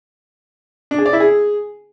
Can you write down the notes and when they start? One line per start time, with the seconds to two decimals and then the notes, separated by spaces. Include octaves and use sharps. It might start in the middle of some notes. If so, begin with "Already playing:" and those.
0.91 D4
0.98 G#4
1.06 D5
1.13 E4
1.20 G#4